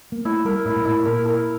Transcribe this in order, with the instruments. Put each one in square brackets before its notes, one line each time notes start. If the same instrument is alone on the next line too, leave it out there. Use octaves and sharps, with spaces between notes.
[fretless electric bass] A#3
[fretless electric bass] A3 [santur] E4
[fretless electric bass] G3 [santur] A#4
[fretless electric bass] A2 [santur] E4
[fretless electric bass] A#2
[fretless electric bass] A2 [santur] E4
[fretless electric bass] A#2 [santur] A#4
[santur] A#4